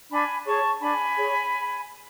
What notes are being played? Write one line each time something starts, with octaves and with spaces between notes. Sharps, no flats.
D4 G#5 B5
G#4 C#5 A5 C#6
D4 G#5 B5
G#4 C#5